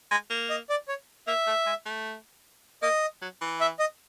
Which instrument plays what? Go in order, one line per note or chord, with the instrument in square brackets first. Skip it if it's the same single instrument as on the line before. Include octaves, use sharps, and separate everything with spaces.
[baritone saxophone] G#3
A#3
[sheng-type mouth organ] D#5
D5
C#5
[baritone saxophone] A#3 [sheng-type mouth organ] E5
[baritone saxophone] A3
G#3
A3
[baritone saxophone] A#3 [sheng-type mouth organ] D#5
[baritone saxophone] F#3
E3
[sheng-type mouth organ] E5
D#5